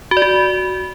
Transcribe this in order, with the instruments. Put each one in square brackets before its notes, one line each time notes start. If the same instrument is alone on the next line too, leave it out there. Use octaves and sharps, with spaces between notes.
[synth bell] F#4
D5
F#4